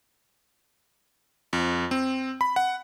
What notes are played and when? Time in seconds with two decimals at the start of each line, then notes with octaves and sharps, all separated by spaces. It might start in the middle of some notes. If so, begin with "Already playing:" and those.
1.53 F2
1.91 C4
2.41 B5
2.56 F#5